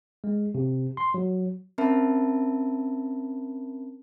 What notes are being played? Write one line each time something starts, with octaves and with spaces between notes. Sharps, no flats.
G#3
C3
C6
F#3
C4 C#4 A#4 E5 A5 B5